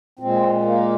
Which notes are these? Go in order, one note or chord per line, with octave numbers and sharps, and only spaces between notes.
A#2 G#3 C4
A#3